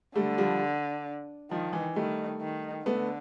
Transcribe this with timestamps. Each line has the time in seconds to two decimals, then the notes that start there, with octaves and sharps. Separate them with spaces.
0.16 D3 G3 A3
0.38 F3 G3
1.51 D#3 F3
1.73 E3
1.95 D#3 G3 A3
2.41 D#3
2.86 D3 A3 B3